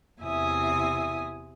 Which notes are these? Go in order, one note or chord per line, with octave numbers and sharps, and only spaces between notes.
E2 C3 E4 E5 G#5 D#6